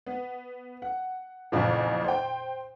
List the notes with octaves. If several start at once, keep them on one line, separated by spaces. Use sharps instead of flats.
B3
F#5
B1 F2 A#2 C#3 E3
C5 G5